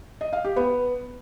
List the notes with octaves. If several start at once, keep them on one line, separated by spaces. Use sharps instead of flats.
D#5
F5
G4
B3